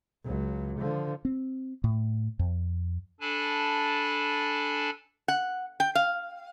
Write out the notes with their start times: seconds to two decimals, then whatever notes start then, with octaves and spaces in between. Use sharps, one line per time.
0.25 C#2 F#3
0.79 D3 F3
1.25 C4
1.84 A2
2.39 F2
3.21 D4 A4 G#5 A5 B5
5.28 F#5
5.80 G5
5.95 F5